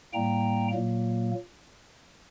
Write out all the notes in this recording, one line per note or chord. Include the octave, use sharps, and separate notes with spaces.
A2 G3 A#3 G5 A#5
A#2 F#3 A#3